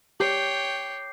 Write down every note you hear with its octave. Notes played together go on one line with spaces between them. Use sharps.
G4 C#5 G5 D6 G6 C7